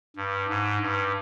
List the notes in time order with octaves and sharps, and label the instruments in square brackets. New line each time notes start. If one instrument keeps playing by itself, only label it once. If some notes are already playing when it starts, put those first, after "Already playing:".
[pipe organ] G2
G#2
G2